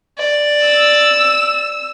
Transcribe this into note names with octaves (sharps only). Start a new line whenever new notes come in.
D5
E6